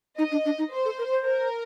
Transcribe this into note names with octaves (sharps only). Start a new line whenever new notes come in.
D#4 D#5
D4
D4
D#4
C5
A4
A#4
C5
A#4